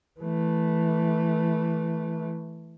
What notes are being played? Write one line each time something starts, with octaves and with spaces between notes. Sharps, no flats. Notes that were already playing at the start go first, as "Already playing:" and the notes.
E3 A3